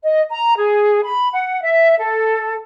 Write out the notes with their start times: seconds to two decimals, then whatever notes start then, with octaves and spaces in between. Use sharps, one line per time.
0.03 D#5
0.30 A#5
0.57 G#4
1.03 B5
1.32 F#5
1.63 E5
1.98 A4